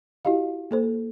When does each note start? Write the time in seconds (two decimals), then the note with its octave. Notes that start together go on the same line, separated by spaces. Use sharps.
0.25 E4 F#4 G4 D#5 F5
0.71 A#3 A4 C5